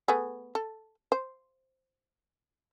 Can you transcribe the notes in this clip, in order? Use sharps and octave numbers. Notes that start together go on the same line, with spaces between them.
A3 B3 G#4
A4
C5